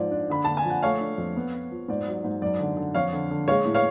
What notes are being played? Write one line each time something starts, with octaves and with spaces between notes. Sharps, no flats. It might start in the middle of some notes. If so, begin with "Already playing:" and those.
Already playing: G#2 F3 D5
D4
D3 B5
D3 A5
G#5
F3
F#5
A3 C#5 F5
D4
F2
B3
B3
F3
G#2 D5
F#3
G#2
F#2 D5
D3
D3
F2 C#5 F5
D3
D3
G#3 C#5 F5
A2
C#5 F5